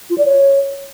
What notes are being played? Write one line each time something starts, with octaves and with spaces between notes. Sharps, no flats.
F4
D5
C#5